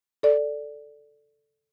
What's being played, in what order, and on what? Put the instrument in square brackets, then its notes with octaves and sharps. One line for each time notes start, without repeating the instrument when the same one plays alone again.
[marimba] A4 D5